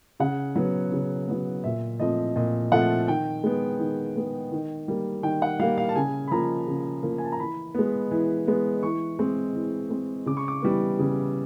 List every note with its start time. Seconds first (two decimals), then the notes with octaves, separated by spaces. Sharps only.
0.20 C#3 F#5
0.56 F#3 B3
0.92 C#3
1.28 F#3 B3
1.64 A#2 E5
1.99 F3 A3 C4 D#5
2.36 A#2 D#5
2.72 F3 A3 C4 F#5
3.08 D#3 G5
3.44 G#3 B3
3.80 D#3
4.16 G#3 B3
4.52 D#3
4.88 G3 A#3
5.23 D#3 G5
5.42 F#5
5.60 G3 A#3 F5
5.78 F5
5.89 A5
5.96 C#3 G#5
6.28 B5
6.31 F3 A#3 A#5
6.67 C#3
7.03 F3 A#3
7.18 G#5
7.25 A5
7.32 A#5
7.39 E3 B5
7.75 G#3 B3
8.11 E3
8.48 G#3 B3
8.83 E3 C#6
9.19 G#3 C4
9.55 E3
9.90 G#3 C4
10.26 C#3 D6
10.37 C#6
10.48 D6
10.62 E3 G3 B3
10.99 C#3